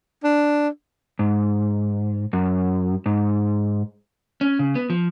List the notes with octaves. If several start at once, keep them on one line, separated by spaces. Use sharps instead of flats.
D4
G#2
F#2
G#2
C#4
C#3
B3
F3